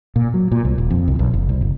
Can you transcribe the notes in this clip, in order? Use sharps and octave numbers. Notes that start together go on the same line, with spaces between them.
A#2
F#3
A#2
C2
D#1
F2
C2
B1
F#1
C2
F#1